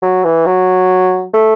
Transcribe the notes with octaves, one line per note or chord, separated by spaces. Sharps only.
F#3
E3
F#3
A3